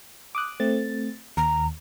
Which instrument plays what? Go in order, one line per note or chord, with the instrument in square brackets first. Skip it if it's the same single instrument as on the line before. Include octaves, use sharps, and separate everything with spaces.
[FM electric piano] D6 D#6 F#6
A3 C4 A6
[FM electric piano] D#2 [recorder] A#5